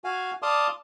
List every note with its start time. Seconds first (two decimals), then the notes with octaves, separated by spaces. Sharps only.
0.04 F#4 F5 G#5
0.42 D5 F5 A5 C6 D#6